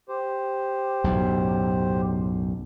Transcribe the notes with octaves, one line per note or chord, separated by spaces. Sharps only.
G4 C5
B1 F#2 A2